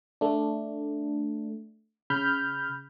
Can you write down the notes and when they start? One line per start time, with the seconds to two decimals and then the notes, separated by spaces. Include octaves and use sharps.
0.21 A3 D4
2.10 C#3 B5 F6 G6